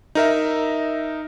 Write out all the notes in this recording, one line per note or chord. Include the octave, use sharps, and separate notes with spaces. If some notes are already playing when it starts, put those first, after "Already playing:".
D#4 A#4 E5